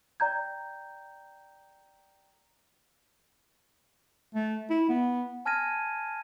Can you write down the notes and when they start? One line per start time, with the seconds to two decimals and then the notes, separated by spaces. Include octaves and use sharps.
0.20 D5 G5 A#5 G6 G#6
4.35 A3
4.70 E4
4.89 B3
5.46 G#5 A5 F6 G#6 A#6 D#7